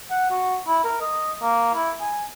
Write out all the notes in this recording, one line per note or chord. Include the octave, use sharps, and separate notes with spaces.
F#5
F#4
E4
A#4
D#5
A#3
E4
G#5